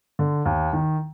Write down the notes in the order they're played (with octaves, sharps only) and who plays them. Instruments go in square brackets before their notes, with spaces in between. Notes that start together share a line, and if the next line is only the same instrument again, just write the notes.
[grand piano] D3
D#2
D#3